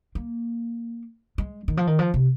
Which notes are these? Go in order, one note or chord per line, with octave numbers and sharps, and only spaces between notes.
A#3
G#3
D#3
F3
D#3
F3
C3